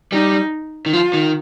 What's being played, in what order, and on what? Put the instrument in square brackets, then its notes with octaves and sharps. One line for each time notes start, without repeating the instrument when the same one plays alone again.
[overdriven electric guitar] G3 [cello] D#4
[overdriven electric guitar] D#3
[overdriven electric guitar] F3 [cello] F4
[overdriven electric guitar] D#3